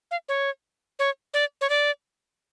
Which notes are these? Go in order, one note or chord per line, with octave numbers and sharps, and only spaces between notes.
F5
C#5
C#5
D5
C#5
D5